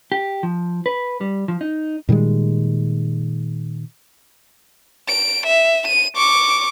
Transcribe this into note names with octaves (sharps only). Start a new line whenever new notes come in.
G4
F3
B4
G3
F3
D#4
A#2 D#3 G3 G#3
D7
E5
D#7
C#6 D6